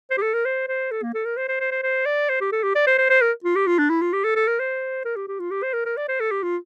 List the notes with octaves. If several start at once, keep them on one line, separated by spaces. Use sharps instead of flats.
C5
G4
A4
A#4
C5
C5
A4
A#3
A4
A#4
C5
C5
C5
C5
C5
D5
C5
G4
A4
G4
D5
C5
C5
C5
A#4
F4
G4
F4
D4
E4
F4
G4
A4
A4
A#4
C5
A#4
G4
G4
F4
G4
C5
A#4
A#4
D5
C5
A4
G4
F4